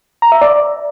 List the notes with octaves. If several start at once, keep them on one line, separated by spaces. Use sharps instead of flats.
A#5
E5
D5